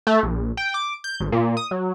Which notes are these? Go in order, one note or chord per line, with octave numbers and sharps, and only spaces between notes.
A3
A#1
G5
D6
G6
G#1
A#2
D#6
F#3